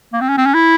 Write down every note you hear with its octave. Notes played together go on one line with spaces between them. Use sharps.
A#3
C4
C#4
C4
C#4
E4